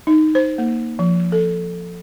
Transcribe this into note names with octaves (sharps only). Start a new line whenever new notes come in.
D#4
C5
A#3
F3
A4